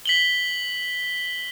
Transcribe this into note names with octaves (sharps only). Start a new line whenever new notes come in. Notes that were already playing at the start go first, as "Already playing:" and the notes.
B6 F#7 G7